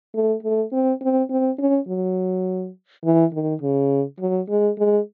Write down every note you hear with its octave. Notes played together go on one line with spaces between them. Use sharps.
A3
A3
C4
C4
C4
C#4
F#3
E3
D#3
C#3
F#3
G#3
G#3